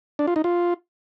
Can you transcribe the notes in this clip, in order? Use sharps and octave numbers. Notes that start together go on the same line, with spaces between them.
D4
F4
D#4
F4